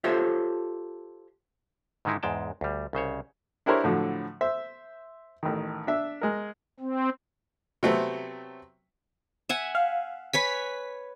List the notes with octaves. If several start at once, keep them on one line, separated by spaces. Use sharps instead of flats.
F4 G4 A4 C5 C#5 E5
G#2 D3 D#3 G#3 D#4 E4
E2 G#2 G#3 G5 A5
D2 G3
C2 C#3 C5 C#5
D4 E4 G4 A#4 C5 C#5
A2 D3 F3 F#3
C5 E5
A1 D#3
D4 E5
G#3 A#4
C4
C3 F#3 A3 B3 C4
E5 F#5 G#5
F5
B4 C#5 G#5 B6